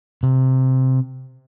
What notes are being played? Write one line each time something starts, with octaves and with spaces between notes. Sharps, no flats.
C3